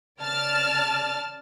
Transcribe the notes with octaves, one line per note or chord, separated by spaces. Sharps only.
C#3 D5 A5 F6 A6